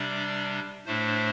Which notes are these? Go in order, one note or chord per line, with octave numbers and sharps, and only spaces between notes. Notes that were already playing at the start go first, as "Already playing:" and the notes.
Already playing: C3 G3 D4 D5
A2 A3 D4 C5